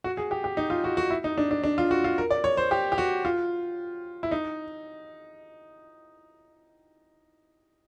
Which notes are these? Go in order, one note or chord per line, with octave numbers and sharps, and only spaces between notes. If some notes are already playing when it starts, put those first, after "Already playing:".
F#4
G#4
G4
G4
D#4
F4
F#4
F#4
E4
D#4
D4
D4
D4
F4
F#4
F4
A#4
D5
C#5
C5
G4
G4
F#4
F4
E4
D#4